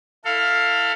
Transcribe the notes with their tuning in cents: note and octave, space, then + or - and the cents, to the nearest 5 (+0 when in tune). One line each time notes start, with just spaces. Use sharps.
E4 +0 A4 +25 F5 +10